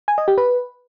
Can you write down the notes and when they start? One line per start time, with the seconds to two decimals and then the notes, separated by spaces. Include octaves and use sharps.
0.08 G#5
0.18 D#5
0.28 G4
0.38 B4